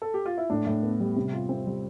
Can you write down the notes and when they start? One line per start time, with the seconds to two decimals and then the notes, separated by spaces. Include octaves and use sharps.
0.02 A4
0.14 G4
0.25 F4
0.38 E4
0.50 A2 D4
0.66 A2
0.83 B3
1.00 G3
1.16 C3
1.33 F4
1.49 C4
1.67 G3